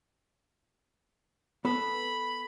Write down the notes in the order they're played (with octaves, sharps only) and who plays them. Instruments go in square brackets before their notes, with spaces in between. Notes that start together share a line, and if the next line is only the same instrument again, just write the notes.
[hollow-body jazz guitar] B3 A4 B4 [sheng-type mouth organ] B5